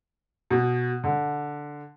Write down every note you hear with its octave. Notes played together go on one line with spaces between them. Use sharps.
B2
D3